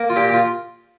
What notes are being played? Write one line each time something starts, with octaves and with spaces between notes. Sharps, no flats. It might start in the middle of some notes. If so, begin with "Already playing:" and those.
Already playing: A#3
F4
A#2 G4
G4
F4